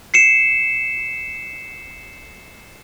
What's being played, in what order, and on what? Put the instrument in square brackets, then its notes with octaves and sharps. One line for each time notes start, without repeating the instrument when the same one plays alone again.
[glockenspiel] C7 C#7 E7